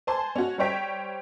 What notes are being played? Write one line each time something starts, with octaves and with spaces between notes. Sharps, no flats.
C5 G#5 A5 C6
C#4 F#4
G3 C5 C#5 G5 B6